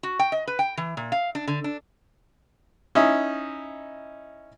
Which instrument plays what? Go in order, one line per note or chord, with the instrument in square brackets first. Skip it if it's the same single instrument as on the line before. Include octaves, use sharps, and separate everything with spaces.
[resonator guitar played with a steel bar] F#4
G5
D#5
B4
G5
E3
A#2
F5
D4
D3
D4
[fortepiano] C#4 D#4 E4